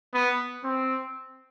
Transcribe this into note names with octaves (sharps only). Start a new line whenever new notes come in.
B3
C4